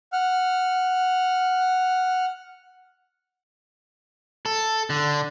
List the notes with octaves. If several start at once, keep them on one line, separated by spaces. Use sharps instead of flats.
F#5 F6
A4
D3